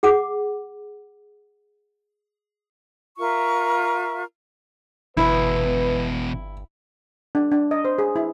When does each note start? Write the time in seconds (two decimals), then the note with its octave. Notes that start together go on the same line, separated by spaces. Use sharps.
0.03 G#4 F#5 D6
3.18 F4 A#4 E5 C#6
5.17 G1 E2 B2 E4 B4
7.35 D4
7.52 D4
7.71 D#5
7.85 C5
7.98 G#4
8.16 E4